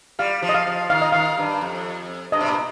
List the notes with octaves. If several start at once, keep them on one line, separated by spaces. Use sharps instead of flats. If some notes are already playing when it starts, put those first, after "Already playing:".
G3 F5
F3
D#5
F5
F3
D#3 F5
D#5
D#3 F5
G2
F2
G2 D#5
C3
A#2